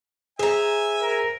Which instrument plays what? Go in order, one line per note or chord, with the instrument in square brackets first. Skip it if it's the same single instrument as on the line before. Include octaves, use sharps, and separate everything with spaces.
[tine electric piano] G#4 [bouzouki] C5 A#5 [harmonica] E5 G#5
[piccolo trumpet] A#4